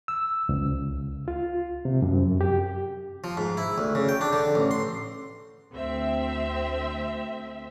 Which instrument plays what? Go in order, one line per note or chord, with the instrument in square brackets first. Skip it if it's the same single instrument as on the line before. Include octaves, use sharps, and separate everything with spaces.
[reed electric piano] E6
C#2
F4
C3
F#2
G4
[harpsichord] F3
G#2
E4
D2
C#3
G5
D4
D3
A1
C6
[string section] D2 C4 E5